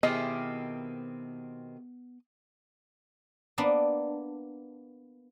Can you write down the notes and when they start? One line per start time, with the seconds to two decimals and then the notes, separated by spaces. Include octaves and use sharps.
0.03 B2 D#3 B3 C4 E4 G4 G#4 D#5
3.58 A#3 B3 D4